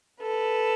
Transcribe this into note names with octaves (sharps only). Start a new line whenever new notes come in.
A4 B4